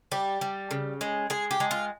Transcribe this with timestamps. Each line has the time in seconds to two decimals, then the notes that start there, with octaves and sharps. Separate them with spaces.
0.12 G3 G4
0.41 G3
0.71 C#3
1.01 G#3
1.30 G#3 G#4
1.51 G4
1.60 G#3
1.71 F4